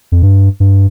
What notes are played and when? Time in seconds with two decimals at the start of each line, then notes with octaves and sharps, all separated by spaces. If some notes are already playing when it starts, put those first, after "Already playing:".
0.12 F2
0.22 G2
0.60 G2